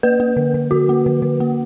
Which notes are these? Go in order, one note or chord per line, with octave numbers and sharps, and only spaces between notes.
A#3 B4
A#3
D3
D3
D3 F#4
A#3
D3
D3
A#3